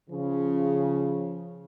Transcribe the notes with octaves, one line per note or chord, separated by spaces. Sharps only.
C#3 F3